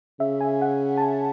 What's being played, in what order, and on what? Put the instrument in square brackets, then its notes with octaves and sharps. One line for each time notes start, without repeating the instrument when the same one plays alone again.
[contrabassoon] C#3 [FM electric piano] E5
[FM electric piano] G#5
F#5
A5
G#5